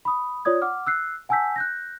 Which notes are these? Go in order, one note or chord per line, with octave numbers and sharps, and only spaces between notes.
B5 D#6
F4 C#5 D5 D#6 G#6
F#5 D6 F6
E6 F#6 C7
F#5 G#5 A5 E6 G6 B6
F#6 G6 A#6